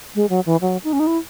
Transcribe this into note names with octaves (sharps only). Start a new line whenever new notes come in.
G#3
F#3
E3
F#3
D#4
C#4
D#4
E4